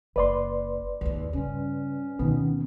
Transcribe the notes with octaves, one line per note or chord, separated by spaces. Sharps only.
F#1 B4 D5 C6
D#2 G#2
G2 C#3 C#4
D2 B2 D#3 B3